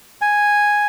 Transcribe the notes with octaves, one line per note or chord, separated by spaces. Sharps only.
G#5